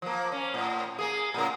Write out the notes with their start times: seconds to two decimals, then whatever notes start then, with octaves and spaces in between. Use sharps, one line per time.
0.02 F3 A#3
0.32 A#3 C#4
0.54 A2
0.99 A#3 G#4
1.34 A2 C#3 A#4